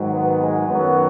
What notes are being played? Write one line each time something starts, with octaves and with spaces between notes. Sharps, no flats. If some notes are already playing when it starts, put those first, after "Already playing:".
Already playing: G#2 D#3 F#3
B3
G#3
F#2 D#3 F#3 B3